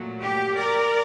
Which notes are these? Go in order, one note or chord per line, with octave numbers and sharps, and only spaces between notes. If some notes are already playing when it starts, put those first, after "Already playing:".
Already playing: A#2 F#3 A3
G4
A#4 D5